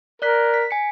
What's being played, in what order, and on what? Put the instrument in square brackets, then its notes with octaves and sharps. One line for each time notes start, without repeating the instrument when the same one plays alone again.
[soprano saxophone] A#4 [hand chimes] D5 F#6 B6
[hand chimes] B6
G#5 C#7